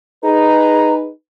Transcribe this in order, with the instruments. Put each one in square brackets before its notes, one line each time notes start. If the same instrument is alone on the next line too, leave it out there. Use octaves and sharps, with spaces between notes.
[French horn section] D#4 G#4 B4 [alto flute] A#5